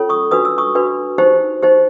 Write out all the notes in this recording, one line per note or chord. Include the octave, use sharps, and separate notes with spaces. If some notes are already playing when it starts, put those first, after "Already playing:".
Already playing: C#4 F4 A4 C#5
C#6 D#6
D4 F#4 B4 D#6
E6
C#6 D#6
D4 F#4 B4
D#4 G4 C5
D#4 G4 C5